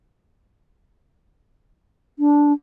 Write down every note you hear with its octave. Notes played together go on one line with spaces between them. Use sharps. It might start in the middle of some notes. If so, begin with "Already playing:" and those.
D4